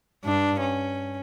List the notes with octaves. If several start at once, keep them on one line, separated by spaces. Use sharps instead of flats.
G2 D4
C#4